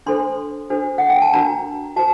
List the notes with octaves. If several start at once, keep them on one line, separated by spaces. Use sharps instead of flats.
D4 A4 C5 C6
D4 F#4 A4 C5
F#5
G5
A5
D4 F#4 A#4 A#5
F#4 C5 A5